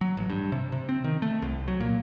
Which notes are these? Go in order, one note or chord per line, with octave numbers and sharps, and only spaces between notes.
F#3
A1
G2
C3
C3
C4
D#3
A3
C2
F#3
A#2